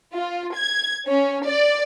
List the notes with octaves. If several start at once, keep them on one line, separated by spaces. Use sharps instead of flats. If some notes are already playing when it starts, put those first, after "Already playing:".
F4
G#6
C#4
D5